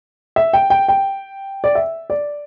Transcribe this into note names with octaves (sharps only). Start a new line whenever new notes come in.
E5
G5
G5
G5
D5
E5
D5